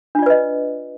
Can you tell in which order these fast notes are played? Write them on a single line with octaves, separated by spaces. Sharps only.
D4 F4 D5 B4 D#5